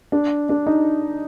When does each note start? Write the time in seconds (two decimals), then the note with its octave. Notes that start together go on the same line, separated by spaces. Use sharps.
0.12 D4
0.49 D4
0.67 D#4